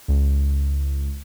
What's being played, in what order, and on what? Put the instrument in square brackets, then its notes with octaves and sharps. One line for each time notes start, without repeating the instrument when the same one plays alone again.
[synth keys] C#2